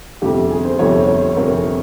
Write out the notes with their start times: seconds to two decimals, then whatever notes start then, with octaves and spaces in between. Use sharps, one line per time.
0.22 G1 F2 C3 G4
0.50 G#4
0.65 C5
0.79 G1 F2 C3 C#5
1.08 C#5
1.36 G1 F2 C3 A#4
1.55 G#4